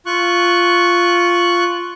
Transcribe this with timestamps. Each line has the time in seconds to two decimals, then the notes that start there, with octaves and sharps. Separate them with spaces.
0.06 F4 C#6 F#6